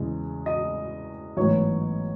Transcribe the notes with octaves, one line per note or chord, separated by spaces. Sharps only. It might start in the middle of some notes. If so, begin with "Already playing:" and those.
Already playing: E2 C#3 G#3
D#5
A1 G#2 F#3 B3 C#5